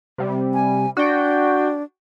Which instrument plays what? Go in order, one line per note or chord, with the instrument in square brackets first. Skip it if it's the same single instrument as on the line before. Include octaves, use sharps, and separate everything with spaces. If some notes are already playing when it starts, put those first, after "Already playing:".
[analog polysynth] C3 G3
[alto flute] G#5
[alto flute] D4 [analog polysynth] F#4 G5